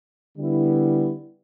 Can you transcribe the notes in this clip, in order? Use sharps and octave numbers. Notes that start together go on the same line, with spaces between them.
D3 G3 B3 E4